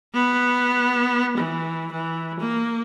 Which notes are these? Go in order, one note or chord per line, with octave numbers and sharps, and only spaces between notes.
B3
E3
E3
A#3